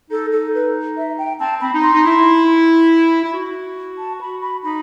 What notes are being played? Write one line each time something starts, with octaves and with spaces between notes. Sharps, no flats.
D#4 A4
A4
B4
E5
G5
C4 A5
C4 B5
D#4
C6
D#4
E4
E4
F#4
A5
B5
B5
D#4 B5